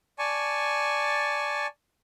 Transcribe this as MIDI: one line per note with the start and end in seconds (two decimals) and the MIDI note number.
0.19 1.67 74
0.19 1.67 80
0.19 1.67 81
0.19 1.67 85